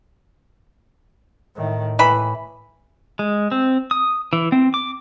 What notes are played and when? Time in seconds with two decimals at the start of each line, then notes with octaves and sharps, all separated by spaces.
1.55 A2 D#3
1.99 A2 E3 B5
3.19 G#3
3.52 C4
3.91 D#6
4.33 E3
4.52 C4
4.74 D6